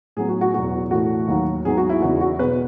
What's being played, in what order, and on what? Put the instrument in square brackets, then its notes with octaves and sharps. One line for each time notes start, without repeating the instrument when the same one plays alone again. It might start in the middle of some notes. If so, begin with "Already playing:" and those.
[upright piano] A2 F#3 B3 G#4
F#4
F#4
E2 B2 F#3 F#4
A2 E3 A3 F#4
D#2 D#3 F#3
G#2 F#3 B3 D#4 G#4
F#4
E4
E2 C#3 E3 B3 D#4 F#4
F#4
B2 G#3 B3 B4